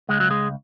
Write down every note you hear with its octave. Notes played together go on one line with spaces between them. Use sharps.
C#2 G#3
F#3
G#3